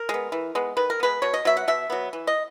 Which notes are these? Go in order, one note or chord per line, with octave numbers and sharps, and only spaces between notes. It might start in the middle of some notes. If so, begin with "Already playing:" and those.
Already playing: A#4
G#3 B3
E3
G#3 B3
D#3 B4
A#4
G#3 B3 B4
B2 C#5
D#5
F#3 B3 E5
F#5
B2 E5
F#3 B3
E3
D#5